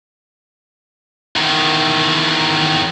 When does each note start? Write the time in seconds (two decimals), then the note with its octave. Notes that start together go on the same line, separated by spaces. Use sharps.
1.36 E2 D#3